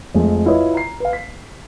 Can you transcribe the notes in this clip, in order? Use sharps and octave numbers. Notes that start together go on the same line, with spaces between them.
F2 G#3 A3
E4 F4 B4 C#5 D#5
A#5 C7
B4 F5
B6